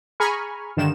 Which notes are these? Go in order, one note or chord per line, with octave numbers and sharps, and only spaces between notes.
G#4 G#5 A#5 B5 C#6 F6
G2 D3 D#3 E7